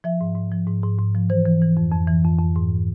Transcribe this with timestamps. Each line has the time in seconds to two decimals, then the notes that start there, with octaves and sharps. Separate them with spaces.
0.04 F3 E5
0.21 G#2
0.35 G#2
0.52 F3
0.67 G#2
0.83 G#2
0.98 G#2
1.15 F3
1.30 E3 C5
1.46 E3
1.62 E3
1.77 F2
1.92 F2
2.08 E3
2.24 F2
2.39 F2
2.56 G#2